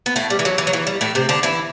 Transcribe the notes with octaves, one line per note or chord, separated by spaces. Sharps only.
B3
A2 A3
G3
E3
F#3
E3
F#3
E3
G3
A2 A3
C3 C4
D3 D4
E3 E4